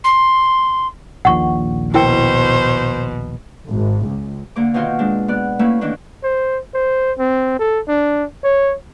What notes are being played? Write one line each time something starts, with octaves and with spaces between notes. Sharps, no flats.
C6
A#1 D#2 A#2 F#5 C#6
B2 E4 A#4 C5 G5
G#1
C#2
D3 A#3 D6
B2 D#3 F4 C#5 G6
G#3 D4
B3 D5 F#6
A3 A#3 C#4 E4 B4 E5
D#3 E3 A#3 D4
C5
C5
C4
A4
D4
C#5